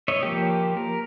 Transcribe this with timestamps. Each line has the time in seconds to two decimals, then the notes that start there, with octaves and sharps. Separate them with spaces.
0.08 C#5 D#5 E5
0.23 F3 A#3 G4
0.77 A#4